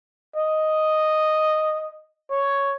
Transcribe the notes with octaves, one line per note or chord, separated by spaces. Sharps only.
D#5
C#5